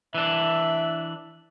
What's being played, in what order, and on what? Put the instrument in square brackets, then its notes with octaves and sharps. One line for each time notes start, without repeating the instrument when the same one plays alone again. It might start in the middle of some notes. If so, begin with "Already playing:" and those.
[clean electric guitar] E3 D4 [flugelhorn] E5